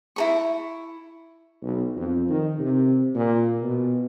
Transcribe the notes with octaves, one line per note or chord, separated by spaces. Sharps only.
E4 A#4 C#6
B1
F2
D#3
C3
A#2
B2